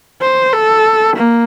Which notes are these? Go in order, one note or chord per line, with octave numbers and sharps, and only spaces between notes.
C5
A4
A#3